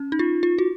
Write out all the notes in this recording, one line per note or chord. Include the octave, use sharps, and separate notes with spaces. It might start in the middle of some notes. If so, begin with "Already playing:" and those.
Already playing: C#4
D#4
F4
F4
F#4